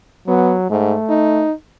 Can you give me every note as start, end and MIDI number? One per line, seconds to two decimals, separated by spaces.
0.28 0.65 54
0.28 0.53 59
0.70 0.94 44
0.70 1.47 57
1.09 1.52 63